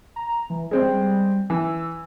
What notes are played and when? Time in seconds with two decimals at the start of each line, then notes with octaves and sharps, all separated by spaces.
0.16 A#5
0.50 E3
0.71 G3 G#3 C4
1.50 E3 E6